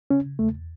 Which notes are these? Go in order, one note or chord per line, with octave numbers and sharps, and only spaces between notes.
C#3 C#4
E2 A3